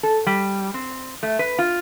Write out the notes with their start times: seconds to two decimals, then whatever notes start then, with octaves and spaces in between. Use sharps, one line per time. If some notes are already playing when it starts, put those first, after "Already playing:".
0.03 A4
0.26 G3
0.74 C4
1.23 A3
1.39 B4
1.59 F4